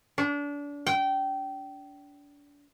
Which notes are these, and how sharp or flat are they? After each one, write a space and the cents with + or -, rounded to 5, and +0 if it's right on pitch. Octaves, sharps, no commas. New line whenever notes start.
D4 -30
G5 -20